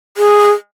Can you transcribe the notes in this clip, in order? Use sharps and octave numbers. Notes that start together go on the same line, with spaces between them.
G#4